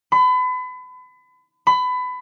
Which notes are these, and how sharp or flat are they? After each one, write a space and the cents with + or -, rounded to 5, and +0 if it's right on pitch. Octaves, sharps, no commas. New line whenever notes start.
B5 +35
B5 +25